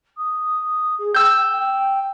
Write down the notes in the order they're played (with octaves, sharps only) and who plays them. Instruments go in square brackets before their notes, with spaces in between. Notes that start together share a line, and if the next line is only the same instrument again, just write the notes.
[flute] D#6
G#4
[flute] G5 [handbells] E6 G6
[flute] G5